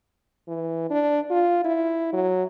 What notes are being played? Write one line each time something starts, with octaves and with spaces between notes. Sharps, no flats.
E3
D4
F4
E4
F#3